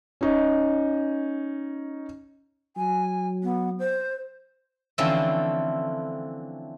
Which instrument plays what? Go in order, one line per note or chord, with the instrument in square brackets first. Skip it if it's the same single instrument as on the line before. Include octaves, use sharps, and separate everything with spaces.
[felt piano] C#4 D#4
[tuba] F#3 [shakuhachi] G#5
[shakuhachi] B3
C5
[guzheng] D3 E3 F3 A3 C4 C#4